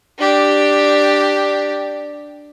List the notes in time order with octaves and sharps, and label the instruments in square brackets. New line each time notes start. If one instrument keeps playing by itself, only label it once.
[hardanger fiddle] D4 G4